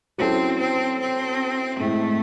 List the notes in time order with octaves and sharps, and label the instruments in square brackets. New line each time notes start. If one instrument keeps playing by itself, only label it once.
[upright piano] F#3 C#4 E4 A4 [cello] C4
[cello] C4
C4
[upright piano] A2 G#3 C4 [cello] A3